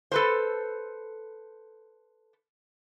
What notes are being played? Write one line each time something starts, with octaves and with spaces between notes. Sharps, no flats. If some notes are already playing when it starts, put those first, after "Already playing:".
A4 B4 C5